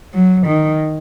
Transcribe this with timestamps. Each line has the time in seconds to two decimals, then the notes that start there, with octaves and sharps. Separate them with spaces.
0.14 F#3
0.47 D#3